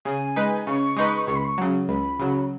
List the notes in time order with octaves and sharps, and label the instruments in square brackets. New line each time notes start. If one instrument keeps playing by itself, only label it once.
[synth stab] C#3 [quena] G#5
[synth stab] G#3 D#4 B4
[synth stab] C#3 [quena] C#6
[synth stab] G#3 D#4 B4
[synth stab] C#2 [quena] C#6
[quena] B5
C#6
[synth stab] C#3 F#3
[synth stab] C#2 [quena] B5
[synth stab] C#3 F#3